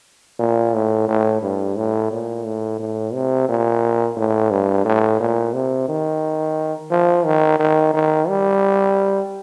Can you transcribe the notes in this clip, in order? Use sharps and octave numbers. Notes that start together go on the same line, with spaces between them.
A#2
A2
A2
G2
A2
A#2
A2
A2
C3
A#2
A2
G2
A2
A#2
C3
D#3
F3
D#3
D#3
D#3
G3